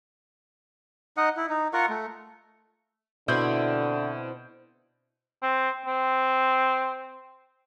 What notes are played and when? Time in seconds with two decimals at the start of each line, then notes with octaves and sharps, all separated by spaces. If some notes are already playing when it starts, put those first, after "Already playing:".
1.17 D#4 D#5 F#5
1.37 E4
1.49 D#4
1.73 F4 A#4 F#5 C#6
1.89 A3
3.28 B2 D3 C4 E4 G6
5.43 C4
5.86 C4